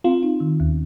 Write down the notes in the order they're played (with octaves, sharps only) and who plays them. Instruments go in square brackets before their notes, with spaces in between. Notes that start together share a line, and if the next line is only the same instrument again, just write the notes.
[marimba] C4 [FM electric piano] F4
[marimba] D#4
D#3
D#2